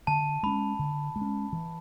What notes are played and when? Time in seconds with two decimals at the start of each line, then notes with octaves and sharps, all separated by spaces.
0.07 D3 A5
0.43 G#3 C#4 B5
0.79 D3
1.16 G#3
1.21 C#4
1.53 E3